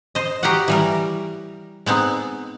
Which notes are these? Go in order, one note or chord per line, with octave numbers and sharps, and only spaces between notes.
C5 D#5
F#4 G4 A#4 D#5 F#5
E3 G3 A#4
G#3 B3 C4 D#4